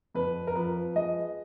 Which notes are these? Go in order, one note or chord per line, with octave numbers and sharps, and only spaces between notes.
F2 B4
A#4
F3 B4
G#3 D#5